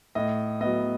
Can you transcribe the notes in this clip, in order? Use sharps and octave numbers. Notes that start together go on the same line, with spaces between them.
A2 D#5
F#3 B3 D#5